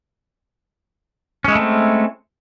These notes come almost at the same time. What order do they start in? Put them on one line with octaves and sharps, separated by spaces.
C#4 G#3 E4 A3 C4